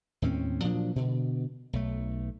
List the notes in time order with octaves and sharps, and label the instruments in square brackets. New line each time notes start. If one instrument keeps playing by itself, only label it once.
[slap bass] D#2 A2 C4 C#4
A#2 F3 F#3 D4
B2 D3
B1 A3